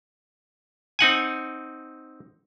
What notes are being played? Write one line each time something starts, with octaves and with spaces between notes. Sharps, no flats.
C4 D#4 F#5 G#5